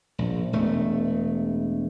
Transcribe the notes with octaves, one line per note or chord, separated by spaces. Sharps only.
A#1
E1 A3